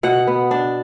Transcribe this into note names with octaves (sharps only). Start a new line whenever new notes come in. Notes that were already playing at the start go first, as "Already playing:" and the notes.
B2 F#5
B3
D4